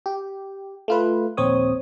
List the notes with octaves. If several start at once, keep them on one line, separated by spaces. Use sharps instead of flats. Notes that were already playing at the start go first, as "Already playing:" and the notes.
G4
A3 F4 B4
A#1 D#2 C4 C#5 D#6